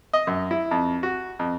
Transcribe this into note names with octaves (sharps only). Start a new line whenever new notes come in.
D#5
F#2
E4
F2
F#4
F2